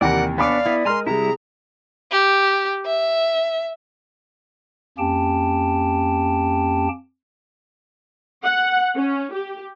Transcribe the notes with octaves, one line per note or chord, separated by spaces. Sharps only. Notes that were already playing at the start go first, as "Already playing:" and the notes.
D#2 C3 E3 A#4 D5 F#5
B3 D4 C#5 D5 F5 G#5 B5 D6
B3 E4
G#3 A#4 G#5 A#5 C6 F6
C3 G3 E4 G#4 A#5
G4
E5
F2 A#3 C#4 G4 G5 A5
F#5
C#4
G4